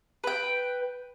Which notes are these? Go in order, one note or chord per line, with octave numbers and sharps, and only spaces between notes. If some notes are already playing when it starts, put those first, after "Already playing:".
B4 G5